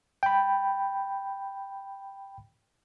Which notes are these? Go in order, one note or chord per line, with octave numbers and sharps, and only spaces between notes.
G5 B5